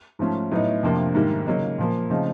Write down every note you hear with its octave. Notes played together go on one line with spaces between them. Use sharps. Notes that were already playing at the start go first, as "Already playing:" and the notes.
G#2 F3 A3 C#4 F4
A2 F#3 B3 D#4
F2 C3 F3 A#3 D4
G#2 D#3 G3 A#3
C#3 F#3 A#3 D#4
A#2 F3 A#3
C#3 F3 A3 C4 D#4